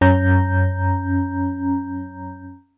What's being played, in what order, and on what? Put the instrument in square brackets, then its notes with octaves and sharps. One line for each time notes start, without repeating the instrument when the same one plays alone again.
[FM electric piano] F#2 C#4 A#5 G6